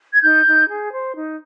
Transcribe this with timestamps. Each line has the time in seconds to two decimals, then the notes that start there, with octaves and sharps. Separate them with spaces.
0.14 G#6
0.22 D#4 G6
0.46 D#4
0.68 G#4
0.92 C5
1.15 D#4